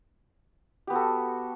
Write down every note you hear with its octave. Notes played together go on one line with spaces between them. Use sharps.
B3 F#4 G4 A4